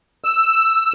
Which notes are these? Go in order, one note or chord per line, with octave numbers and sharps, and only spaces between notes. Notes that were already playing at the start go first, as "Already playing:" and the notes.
E6